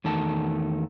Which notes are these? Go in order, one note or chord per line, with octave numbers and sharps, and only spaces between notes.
E2 D#3 A3 A5